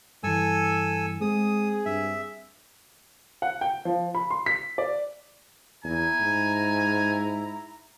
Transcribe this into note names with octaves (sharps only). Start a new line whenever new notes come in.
G2 E3 A4 G#5 E6
G#3 C4 G#4 D#6
G2 E5
F#5
G5
F3
B5
C6
B6
D5
E2 E4 G#5 A#5
G#2